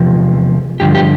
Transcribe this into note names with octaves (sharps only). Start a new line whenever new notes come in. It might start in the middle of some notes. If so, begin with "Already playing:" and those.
Already playing: E2 C3 F3
G2 D3 F3 G4
G4